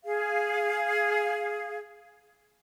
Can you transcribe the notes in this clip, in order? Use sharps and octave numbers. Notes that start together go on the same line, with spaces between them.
G#4 F5